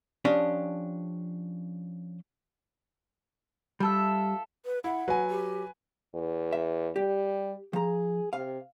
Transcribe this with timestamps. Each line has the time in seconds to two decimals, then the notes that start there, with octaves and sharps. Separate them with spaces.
0.25 F3 C#4 D4 G4 D#5 A5
3.80 G3 F4 A4 E5
4.65 B4
4.84 E4 F#5
5.08 F#3 B4 G#5
5.30 G4
6.14 E2
6.53 E5
6.96 G3 G4
7.73 F3 G#4 A#5
8.33 C3 F5